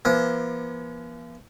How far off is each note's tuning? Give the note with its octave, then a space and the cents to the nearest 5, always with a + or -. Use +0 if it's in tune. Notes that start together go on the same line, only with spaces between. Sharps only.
F3 -45 B3 -45